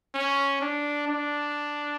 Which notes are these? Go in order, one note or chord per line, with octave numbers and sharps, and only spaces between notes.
C#4
D4
D4